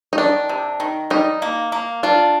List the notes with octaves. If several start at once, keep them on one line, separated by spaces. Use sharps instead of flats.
D#4
D#3 D4
C3
D#3
G3 D#4
A#3
A#3
D4 F4